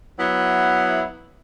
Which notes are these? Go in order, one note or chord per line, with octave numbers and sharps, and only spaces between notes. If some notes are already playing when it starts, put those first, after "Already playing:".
F#3 B3 E4